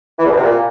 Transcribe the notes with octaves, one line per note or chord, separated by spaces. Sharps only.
E3
E2
B2
C3
A#2